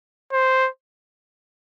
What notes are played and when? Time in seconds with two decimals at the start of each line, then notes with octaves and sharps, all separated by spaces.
0.33 C5